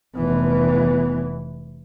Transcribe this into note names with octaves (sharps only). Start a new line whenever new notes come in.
F1 E3 B3